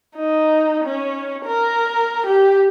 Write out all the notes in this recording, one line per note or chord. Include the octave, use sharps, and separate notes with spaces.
D#4
C#4
A#4
G4